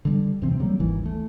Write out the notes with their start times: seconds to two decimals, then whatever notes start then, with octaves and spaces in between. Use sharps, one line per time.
0.05 D3 G3
0.42 E2 C3 E3 C4
0.59 C#3 F#3 G3 A#3
0.80 G#1 D#2 E3
1.05 A3